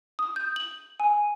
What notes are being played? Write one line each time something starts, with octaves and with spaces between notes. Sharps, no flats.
D#6
G6
F#7
G#5